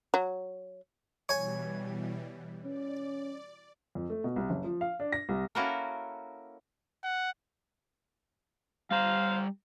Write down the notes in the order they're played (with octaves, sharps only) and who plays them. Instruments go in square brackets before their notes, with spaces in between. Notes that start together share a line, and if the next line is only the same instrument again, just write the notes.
[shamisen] F#3
[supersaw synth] B2 E3 G3 [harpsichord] C#5 G#5
[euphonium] C#4 [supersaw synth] D5
[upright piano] F2
A3
B2
C2
F#1
F3
F5
D4
A#6
C2
[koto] A#3 C#4 E4 F#4 A4 A#4
[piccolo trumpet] F#5
[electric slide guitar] G3 A#5 [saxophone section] C5 F5